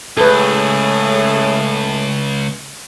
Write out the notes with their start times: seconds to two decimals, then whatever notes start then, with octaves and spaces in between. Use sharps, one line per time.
0.17 C#2 A2 C#3 A3 G#4 A4 B4